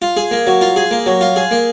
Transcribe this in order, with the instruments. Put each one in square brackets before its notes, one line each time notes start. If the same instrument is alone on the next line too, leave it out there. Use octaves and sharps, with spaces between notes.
[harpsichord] F4
G#4
A#3
F#3
F4
G#4
A#3
F#3
F4
G#4
A#3